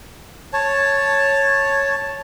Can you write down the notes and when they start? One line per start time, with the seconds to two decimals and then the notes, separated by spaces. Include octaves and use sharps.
0.53 C#5 A5